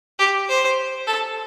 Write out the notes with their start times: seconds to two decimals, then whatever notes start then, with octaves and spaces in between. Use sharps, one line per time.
0.19 G4
0.49 C5
1.07 A4